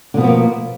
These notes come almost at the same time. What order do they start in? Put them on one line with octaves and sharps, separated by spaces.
D3 B2 F3 B3 A#3